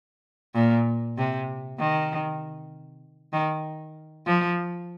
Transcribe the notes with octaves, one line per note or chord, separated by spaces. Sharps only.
A#2
C3
D#3
D#3
F3